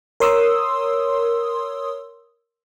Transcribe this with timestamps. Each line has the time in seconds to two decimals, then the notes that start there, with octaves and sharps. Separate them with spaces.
0.20 A#4 C#5 C6 D#6 E6